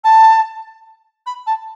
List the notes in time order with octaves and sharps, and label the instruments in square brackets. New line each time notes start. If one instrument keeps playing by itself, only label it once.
[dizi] A5
B5
A5